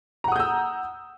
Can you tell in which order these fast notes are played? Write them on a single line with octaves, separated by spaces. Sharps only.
A#5 F#5 D#6 G6 E6